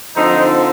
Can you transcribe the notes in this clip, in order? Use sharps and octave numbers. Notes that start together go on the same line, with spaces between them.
D3 F3 C4 D#4